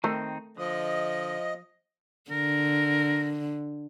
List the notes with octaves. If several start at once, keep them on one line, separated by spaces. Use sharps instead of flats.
D#3 A3 C4 D#4 A#4
D3 F3 D#5
D3 A#4